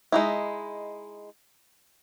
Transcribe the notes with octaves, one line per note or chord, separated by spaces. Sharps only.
G#3 D#4 E4